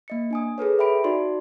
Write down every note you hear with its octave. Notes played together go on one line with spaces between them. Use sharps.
A#3 D#5 C#7
D4 G#5 D#6
G#4 A4 B4 C#5
E5 G5 B5 D7
D#4 F#4 D5 C6